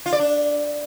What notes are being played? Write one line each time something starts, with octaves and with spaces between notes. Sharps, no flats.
F4
D5
D4